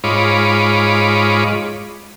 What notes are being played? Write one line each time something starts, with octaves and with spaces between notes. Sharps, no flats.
G#2 F4 C#5 D#5 B5 D6